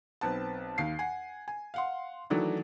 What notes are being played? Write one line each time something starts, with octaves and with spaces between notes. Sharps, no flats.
B1 C4 B4 A5
D#2 F5 C7
F#5 G#5
G#5
F5 F#5 C6
D#3 E3 F#3 A3 D4